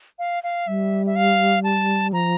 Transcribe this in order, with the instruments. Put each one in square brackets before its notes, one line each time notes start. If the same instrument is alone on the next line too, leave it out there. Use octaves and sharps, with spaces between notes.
[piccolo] F5
F5
[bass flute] G3 [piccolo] E5
[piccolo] E5
F5
A5
[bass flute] F3 [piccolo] A#5